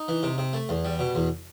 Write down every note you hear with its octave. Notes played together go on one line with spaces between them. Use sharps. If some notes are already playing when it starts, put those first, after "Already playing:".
Already playing: D#4
E3
C3
C3
A3
E2
G3
B2
E2